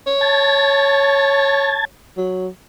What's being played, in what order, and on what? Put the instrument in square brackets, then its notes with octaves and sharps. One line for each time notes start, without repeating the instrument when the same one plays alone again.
[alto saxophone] C#5
[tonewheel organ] A5 G#6 A6
[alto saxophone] F#3